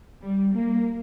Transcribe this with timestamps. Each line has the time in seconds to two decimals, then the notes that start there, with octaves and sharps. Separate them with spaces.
0.22 G3
0.54 A#3